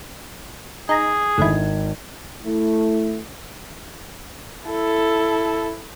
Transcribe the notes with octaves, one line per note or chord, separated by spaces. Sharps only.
D#4 G#4 A#5
G#1 D3 D#3 E4 G#6
A3 E4
E4 A4